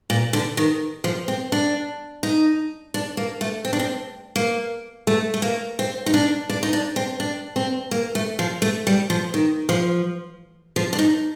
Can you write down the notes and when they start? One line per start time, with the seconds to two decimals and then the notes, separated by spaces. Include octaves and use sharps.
0.10 A#2
0.33 D3
0.57 D#3
1.04 F3
1.28 C4
1.52 D4
2.23 D#4
2.94 D4
3.17 A#3
3.41 A3
3.65 C4
3.73 D4
3.79 C4
4.36 A#3
5.07 A3
5.34 A3
5.42 A#3
5.79 C4
6.06 D#4
6.14 D4
6.49 D4
6.63 D#4
6.73 D4
6.96 C4
7.20 D4
7.56 C4
7.91 A#3
8.15 A3
8.39 F3
8.62 A3
8.87 G3
9.10 F3
9.34 D#3
9.69 F3
10.76 F3
10.93 D4
10.99 D#4